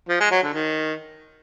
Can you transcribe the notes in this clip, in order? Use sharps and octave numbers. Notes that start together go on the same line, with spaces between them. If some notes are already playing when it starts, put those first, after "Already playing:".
F3
G#3
F#3
D3
D#3